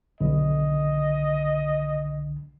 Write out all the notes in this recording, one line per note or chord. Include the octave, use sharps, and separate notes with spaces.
B1 D3 D#5